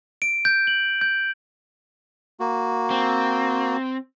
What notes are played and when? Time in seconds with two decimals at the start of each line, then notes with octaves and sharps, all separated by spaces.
0.22 D7
0.45 G6
0.67 F#7
1.01 G6
2.40 A#3 F#4
2.90 C4